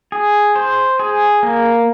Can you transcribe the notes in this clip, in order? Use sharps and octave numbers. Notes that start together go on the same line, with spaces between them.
G#4
C5
G#4
A#3